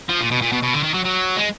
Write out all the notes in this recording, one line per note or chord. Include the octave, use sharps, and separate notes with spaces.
F3
A#2
B2
A#2
B2
B2
D3
D#3
F#3
F#3
G#3